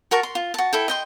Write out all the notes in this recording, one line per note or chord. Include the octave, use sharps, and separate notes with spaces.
F#4 A#4 A5 C#6
C6
F4
F#4 A5
E4 A4 G5
D#5 G5 C6